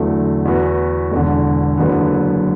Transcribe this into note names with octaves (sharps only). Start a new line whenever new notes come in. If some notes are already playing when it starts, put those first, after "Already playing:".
Already playing: E2 D3 F#3 A3
E2 E3 B3 F#4
E1 E2 D3
F#1 F#2 D3 F#3 B3